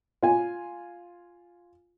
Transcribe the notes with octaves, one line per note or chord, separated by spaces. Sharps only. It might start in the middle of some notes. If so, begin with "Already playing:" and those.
F4 G#5